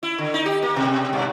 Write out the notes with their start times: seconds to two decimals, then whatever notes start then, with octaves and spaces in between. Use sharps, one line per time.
0.03 E4
0.18 D3
0.34 D#4
0.46 G4
0.63 A#3
0.76 B2
1.13 G2